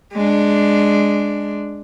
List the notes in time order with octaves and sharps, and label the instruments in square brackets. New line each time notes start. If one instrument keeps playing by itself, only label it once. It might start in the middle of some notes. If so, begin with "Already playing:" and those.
[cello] G#3 D4